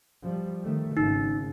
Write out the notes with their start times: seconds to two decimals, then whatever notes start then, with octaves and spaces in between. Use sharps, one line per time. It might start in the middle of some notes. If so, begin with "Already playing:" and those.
0.22 F3 G3
0.64 D#3 A3
0.97 G#1 C#3 D#4